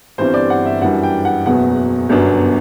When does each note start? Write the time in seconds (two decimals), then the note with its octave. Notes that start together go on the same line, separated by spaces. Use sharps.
0.18 G1 G2 E3 G3 C4 C5
0.34 D5
0.50 F#5
0.66 E5
0.82 F#2 E3 G3 D4 F#5
1.03 G5
1.25 F#5
1.46 F#1 E2 B2 F#3 B3 F#5
2.09 G1 F#2 F#3 B3 D4